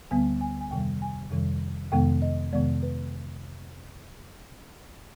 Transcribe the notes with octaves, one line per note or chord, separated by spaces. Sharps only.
D2 D3 G3 B3 G#5
G#5
G#5
F2 C3 D#3 G3 G5
G#5
F2 C3 D#3 G3
F2 C3 D#3 G#3 B3 G5
D#5
F2 C3 D#3 G#3 B3 D5
B4